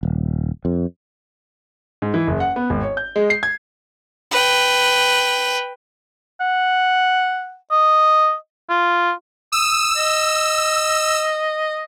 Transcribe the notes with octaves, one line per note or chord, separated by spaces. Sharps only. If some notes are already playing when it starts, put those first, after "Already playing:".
D#1
F2
G#2
E3
F#1
F#5
B3
G#1
C#5
G6
G#3
C7
G#6
B4 G5
F#5
D#5
F4
D#6 E6
D#5